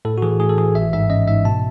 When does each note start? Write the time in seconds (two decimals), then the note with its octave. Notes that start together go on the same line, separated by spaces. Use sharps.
0.05 A2 A4
0.18 F#4
0.22 E3 G#4
0.40 A2 G#4
0.49 A4
0.58 E3 G#4
0.75 G#1 E5
0.93 G#2 E5
1.10 C#4 D#5
1.27 G#2 E5
1.45 B2 A5